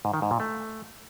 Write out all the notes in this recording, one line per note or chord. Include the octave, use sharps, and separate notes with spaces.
G#2
D#3
G#2
A#2
A3